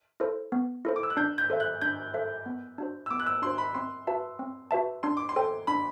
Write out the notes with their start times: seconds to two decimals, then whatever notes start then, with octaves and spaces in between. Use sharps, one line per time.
0.20 E4 A4 C5
0.52 B3
0.85 E4 A4 C5
0.96 D6
1.03 E6
1.10 F#6
1.17 D4 G6
1.38 G6
1.50 A4 C5 E5
1.60 F#6
1.81 D4 G6
2.14 A4 C5 E5
2.46 B3
2.78 D4 F#4 C5
3.06 E6
3.11 B3 D6
3.20 F#6
3.26 E6
3.42 D4 F#4 C5 C6
3.58 B5
3.74 C4 C6
4.07 F#4 B4 E5 A5
4.39 C4
4.71 F#4 B4 E5 A5
5.03 D4 C6
5.17 D6
5.29 C6
5.36 A4 C5 G5
5.67 D4 B5